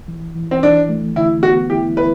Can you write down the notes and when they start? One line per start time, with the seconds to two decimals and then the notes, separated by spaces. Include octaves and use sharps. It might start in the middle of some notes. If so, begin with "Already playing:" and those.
0.08 E3
0.35 E3
0.51 C4
0.63 E3 D4
0.89 A3
1.16 D3 E4
1.43 B3 F#4
1.70 E4 G4
1.97 E4 B4